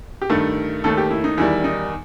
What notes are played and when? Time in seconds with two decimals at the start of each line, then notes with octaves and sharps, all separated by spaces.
0.22 G4
0.30 G2 D#3 A3 A4
0.84 D#2 D#3 A3 A4
0.98 G4
1.11 E4
1.24 D#4
1.38 E2 D#3 G3 E4
1.64 D#4